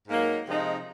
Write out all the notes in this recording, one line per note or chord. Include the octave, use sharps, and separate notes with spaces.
G#2 F#3 A#3 D#4
C3 F3 G#3 D#4